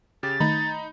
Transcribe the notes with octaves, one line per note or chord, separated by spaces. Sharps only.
C#3 G4 A6
D#3 A3 D#4 A#5 B5